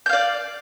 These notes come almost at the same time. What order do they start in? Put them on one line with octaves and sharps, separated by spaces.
G6 F5 D5